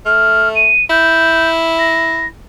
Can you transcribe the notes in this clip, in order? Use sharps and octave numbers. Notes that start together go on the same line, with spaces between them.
A3 F6
D#7
E4 G6
A#6